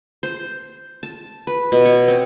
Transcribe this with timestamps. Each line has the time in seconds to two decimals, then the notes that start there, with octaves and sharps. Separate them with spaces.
0.23 C5
1.03 A5
1.47 B4
1.72 B2
1.85 C#5
2.08 C4